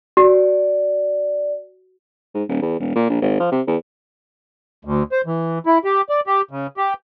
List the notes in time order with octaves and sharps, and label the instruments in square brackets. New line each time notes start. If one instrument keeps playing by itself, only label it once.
[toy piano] F#4 [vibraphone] D5
[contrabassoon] G#2
D#1
E2
E1
A#2
A#1
G#1
F3
C3
E2
[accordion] D2
C5
E3
E4
G4
D5
G4
C#3
G4